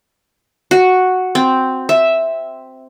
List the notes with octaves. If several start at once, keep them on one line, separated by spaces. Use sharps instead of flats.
F#4
C4
E5